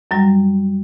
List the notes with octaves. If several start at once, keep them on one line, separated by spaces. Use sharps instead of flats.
F#2 F#3 G3